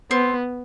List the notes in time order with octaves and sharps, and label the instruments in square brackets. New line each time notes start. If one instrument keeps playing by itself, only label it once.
[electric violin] B3 [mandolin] C4